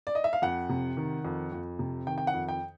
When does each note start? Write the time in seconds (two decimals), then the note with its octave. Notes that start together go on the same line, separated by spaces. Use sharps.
0.07 D5
0.15 D#5
0.24 E5
0.33 F5
0.42 F2 F#5
0.69 C3
0.97 D#3
1.25 F2
1.52 F2
1.79 C3
2.07 D#3 G5
2.18 G5
2.27 F#5
2.34 F2
2.49 G5